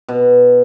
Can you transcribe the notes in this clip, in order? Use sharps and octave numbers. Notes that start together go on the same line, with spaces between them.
B2